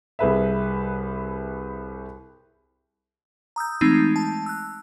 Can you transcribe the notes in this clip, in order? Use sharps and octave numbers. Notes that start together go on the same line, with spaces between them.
C2 G#4 B4 E5
A#5 D#6 E6 G6
E3 G#3 A3 C4 D#4
A5
E6 F#6